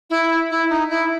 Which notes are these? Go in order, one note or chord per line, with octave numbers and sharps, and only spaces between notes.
E4
E4
D#4
E4